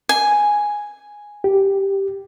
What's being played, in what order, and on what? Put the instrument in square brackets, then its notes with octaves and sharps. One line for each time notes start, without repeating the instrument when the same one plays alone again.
[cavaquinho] G#5
[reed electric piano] G4